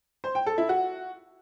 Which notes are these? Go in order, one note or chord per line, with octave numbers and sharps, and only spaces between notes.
C5
G5
A4
E4
F#4